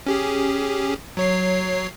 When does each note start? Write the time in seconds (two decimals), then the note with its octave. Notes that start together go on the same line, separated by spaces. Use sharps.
0.06 C#4 G4 G#4
1.17 F#3 C#5 C7